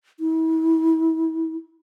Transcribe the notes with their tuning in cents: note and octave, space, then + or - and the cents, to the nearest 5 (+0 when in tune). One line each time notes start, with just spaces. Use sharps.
E4 -35